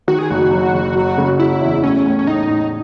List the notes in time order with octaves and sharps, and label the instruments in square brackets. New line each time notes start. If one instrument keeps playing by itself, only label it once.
[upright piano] D#3 [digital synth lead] F#4
[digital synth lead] G#4
[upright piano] F#1 [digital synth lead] F#4
[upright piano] F#2
F#1
F#3
C#3
[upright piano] F#3 [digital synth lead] E4
[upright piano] E2
[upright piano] A2 [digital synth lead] C#4
[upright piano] A2
[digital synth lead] C#4
[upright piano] A2 [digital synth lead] D#4
[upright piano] A2